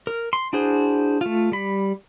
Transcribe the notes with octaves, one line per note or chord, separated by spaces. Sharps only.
A#4
C6
D4 E4 F#4 G#4 C5
A3 F4
G3 B5